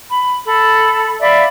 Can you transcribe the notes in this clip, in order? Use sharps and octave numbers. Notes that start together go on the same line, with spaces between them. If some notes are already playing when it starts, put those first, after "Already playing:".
B5
A4 B5
D5 E5 F5 B5